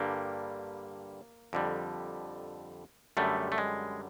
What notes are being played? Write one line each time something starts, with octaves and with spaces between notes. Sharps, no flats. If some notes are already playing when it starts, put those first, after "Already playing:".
Already playing: G2 D3 G3 A#3
F2 D3 G3
F#2 D3 G3 A3
A3
G#3